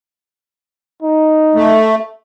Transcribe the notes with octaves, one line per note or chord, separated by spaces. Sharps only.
D#4
A3